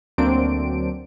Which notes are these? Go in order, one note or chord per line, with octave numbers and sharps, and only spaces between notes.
D2 F#3 A#3 C4 D4 D7